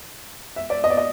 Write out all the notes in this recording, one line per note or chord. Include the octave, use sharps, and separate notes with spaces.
E5
D5
D#5
D5
D#5